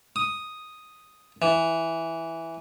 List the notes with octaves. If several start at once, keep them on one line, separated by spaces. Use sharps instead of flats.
D#6
E3